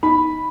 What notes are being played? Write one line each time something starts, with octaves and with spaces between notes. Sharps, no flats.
D#4 B5